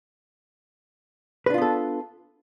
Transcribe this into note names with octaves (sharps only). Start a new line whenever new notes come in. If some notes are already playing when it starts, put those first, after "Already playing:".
B3 D4 F4 A4 B4